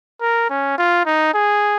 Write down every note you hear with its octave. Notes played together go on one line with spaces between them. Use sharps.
A#4
C#4
F4
D#4
G#4